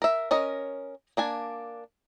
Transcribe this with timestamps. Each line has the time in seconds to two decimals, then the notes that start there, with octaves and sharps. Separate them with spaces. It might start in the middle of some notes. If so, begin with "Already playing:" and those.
0.02 A#4 E5
0.31 C#4 A#4 D#5
1.17 A#3 D4 G#5